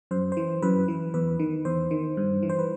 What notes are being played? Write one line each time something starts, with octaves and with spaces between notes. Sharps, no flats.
F#2 C5
E3 C5
F#2 B4
E3
E2 B4
D#3
E2 C5
D#3
G2
E3
C5
B4